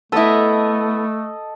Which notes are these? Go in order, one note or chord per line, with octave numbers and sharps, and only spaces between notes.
A3 B3 E4 A4 D#5